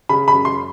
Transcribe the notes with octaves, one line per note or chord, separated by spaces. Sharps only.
C#3 B5
B5
F#2
C6